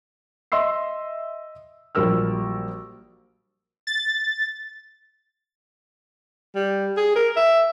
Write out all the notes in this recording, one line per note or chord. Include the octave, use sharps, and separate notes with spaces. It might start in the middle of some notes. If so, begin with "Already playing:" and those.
D#5 E5 C6 E6 C7
A#1 F#3 G3 A#4 E6 F6
A6
G3
G#4
A#4
E5